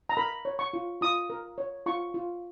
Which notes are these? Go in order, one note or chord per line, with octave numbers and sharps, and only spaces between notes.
A#5
A#4 B5
C#5
C#6
F4
F4 D#6
A#4
C#5
F4 C#6
F4